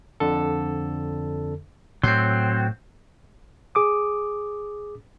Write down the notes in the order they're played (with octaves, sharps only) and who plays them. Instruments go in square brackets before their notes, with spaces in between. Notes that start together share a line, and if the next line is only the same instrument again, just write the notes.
[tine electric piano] F2 D3 A4
[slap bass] A2 [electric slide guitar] F#3 C4 [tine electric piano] C6 G6 C7
[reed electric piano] G#4 D6 D#6